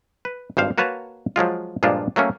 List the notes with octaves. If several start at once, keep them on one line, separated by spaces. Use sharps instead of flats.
B4
G#1 G2 C5 F5
A#3 F#4 B4 C#5 A5 A#5
F3 F#3 G#3 F4
G2 A#2 F3 G#3 D4 F4
F#3 A3 A#3 C#4